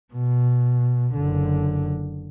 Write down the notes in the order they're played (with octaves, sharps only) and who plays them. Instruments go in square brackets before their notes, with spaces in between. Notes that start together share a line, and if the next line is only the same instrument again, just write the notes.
[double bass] B2
F#1 D3